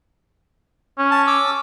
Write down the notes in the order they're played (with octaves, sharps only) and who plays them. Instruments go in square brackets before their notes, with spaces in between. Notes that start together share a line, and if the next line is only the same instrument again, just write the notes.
[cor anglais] C#4
[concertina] A5
D6 E6